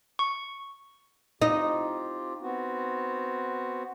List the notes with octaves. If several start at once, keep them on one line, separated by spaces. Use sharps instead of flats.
C#6
C4 D#4 F4 G4
B3 C4 F#4